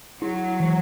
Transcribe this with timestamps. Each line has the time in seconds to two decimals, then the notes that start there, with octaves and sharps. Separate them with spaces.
0.22 F#3 E4
0.60 E3